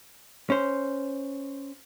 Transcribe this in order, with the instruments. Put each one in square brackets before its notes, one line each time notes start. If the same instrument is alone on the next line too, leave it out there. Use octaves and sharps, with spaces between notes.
[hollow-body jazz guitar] C#4 C5